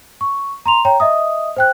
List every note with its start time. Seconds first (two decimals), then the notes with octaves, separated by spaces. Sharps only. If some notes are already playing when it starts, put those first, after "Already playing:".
0.21 C#6
0.66 A#5 C6 F7
0.85 C#5 G5 A#5
1.00 D#5 E5 D#6
1.57 C5 G5 F#6